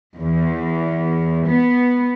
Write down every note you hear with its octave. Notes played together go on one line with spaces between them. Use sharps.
E2
B3